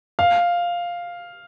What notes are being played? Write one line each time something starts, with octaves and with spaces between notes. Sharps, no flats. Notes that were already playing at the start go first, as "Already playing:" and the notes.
F5